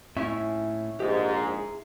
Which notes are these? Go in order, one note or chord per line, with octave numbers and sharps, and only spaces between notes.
A2 C#4 E4 E5
A#1 G#2 G4
G#4 A#5